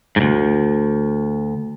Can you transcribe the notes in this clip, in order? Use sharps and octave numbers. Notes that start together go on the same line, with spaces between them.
D2 G#2